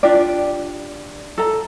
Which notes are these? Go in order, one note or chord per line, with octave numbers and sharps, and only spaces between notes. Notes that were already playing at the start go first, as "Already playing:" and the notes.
D4 F4 G4 D5
A4 A#5